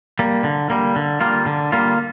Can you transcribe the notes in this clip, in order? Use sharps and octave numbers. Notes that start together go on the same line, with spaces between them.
G3 A#3
D3
G3 A#3
D3
G3 A#3 F4
D3
G3 A#3 F4